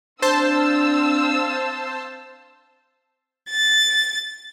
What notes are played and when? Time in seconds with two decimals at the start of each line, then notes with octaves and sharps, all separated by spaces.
0.22 C4 D4 C5 F5 A5 E6
3.49 A6